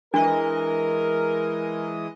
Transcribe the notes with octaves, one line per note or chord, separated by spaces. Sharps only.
E3 G#3 D4 A#4 D#5